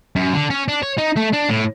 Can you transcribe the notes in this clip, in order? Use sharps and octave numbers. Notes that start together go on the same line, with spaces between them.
F#2
D3
C#4
D4
C#5
D#4
A3
D4
A2